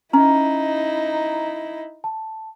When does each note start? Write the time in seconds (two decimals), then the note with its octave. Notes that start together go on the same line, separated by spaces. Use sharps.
0.13 C#4 D#4 E4 A#5
2.04 A5